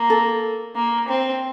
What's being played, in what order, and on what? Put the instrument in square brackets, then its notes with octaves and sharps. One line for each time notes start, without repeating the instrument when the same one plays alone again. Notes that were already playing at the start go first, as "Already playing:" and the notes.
Already playing: [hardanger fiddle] A#3
[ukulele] A4
[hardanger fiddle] A#3
C4